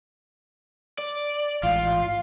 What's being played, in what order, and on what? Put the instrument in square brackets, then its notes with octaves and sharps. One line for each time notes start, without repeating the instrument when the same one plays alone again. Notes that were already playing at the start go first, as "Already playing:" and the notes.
[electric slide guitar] D5
[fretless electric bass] A1 G#2 [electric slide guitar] F4 [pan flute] F5